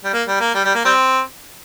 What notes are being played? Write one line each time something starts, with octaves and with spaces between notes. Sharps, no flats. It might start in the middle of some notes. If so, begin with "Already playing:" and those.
G3
A#3
G3
A#3
G3
G3
A#3
G3 C4